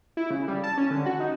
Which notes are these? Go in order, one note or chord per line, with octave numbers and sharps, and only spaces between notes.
E4
C#3
G3
A5
C#4
D3
F#4
D#4